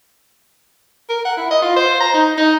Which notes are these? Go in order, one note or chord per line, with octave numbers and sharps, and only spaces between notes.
A#4
F#5
E4
D#5
F4
C5
A#5
D#4
D#4